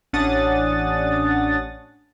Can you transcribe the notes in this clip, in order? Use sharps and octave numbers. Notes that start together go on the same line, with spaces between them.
A1 C#4 D4 F#5 D#6 A6